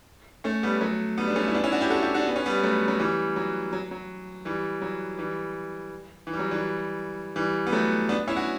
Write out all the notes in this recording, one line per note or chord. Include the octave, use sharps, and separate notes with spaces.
A3 C#4
G3 B3
G3
F#3 A3
G3 B3
D4
A3 C#4
E4
B3 D4
C#4 E4
D4 F#4
E4 G4
F#4 A4
E4 G4
D4 F#4
B3
C#4
G3 B3
F#3 A3
F#3
E3 G3
F#3
F#3
F#3
E3 G3
F#3
E3 G3
E3
G3
F#3
E3 G3
E3 G3
B3
F#3 A3
B3 D4
C#4 E4
F#4